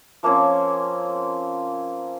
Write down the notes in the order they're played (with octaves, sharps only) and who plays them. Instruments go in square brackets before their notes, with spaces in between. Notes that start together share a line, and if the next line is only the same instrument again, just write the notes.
[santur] F3 A#3 C4 C#4